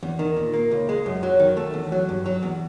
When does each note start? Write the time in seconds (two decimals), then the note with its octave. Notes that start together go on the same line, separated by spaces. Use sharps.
0.03 E2
0.19 D#3
0.37 A#2
0.54 A#3
0.71 C#2
0.89 G#3
1.06 F#2
1.23 F#3
1.39 D#3
1.57 A3
1.74 E2
1.92 F#3
2.09 G2
2.26 F#3
2.43 E2